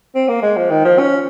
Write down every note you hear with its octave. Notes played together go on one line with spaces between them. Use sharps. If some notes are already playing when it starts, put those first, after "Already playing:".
C4
A#3
G#3
F3
D#3
F3
C#4